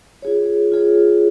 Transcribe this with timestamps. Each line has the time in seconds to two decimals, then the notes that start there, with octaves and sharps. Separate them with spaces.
0.22 F4 G#4 C#5
0.72 F4 G#4 C#5